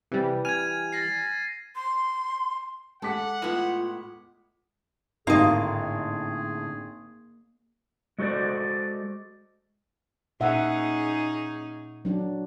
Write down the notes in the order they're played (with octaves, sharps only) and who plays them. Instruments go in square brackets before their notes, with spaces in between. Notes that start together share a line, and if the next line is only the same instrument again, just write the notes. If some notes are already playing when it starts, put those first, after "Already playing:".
[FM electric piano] C3 [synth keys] E3 G3
[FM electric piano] G#5 F6 [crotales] G#6 D#7
[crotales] A6 A#6 C7
[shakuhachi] C6
[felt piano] G#3 D6 B6 [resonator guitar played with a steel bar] A4 [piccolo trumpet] F#5
[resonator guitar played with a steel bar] A2 B3 [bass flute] F4
[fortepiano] G#1 [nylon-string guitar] A2 D3 A3 [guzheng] A#3 D#5 [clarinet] G#4
[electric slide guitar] G#3 F#4 A4 C5 D5
[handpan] A#2 E5 F#5 [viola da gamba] C#4 D#4 G#4
[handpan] F#3 D4